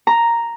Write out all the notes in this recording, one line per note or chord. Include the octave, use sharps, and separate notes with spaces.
A#5